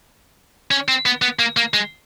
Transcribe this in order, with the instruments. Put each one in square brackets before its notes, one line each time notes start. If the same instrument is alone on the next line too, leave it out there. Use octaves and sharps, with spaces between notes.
[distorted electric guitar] C#4
C4
B3
B3
A#3
A#3
G#3